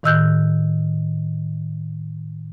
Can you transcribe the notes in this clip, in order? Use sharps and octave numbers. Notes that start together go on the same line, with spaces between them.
A2 D#3 D#5 E6 F#6 G6